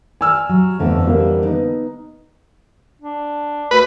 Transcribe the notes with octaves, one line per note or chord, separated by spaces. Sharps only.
D5 G#5 E6 F6
F#3
G1 F2 D3 E3 A3
G3 A#3
B3 D#4
D4
D2 B4